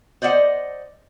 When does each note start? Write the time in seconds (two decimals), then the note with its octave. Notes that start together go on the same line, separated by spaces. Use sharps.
0.22 C5 D5 D#5 F5 F#5